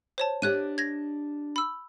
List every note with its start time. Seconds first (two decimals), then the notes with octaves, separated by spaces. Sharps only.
0.18 C5 C#5 A5
0.42 D4 G4 C#5 D#5 F#6 D#7
0.78 G#6 A#6
1.56 B5 E6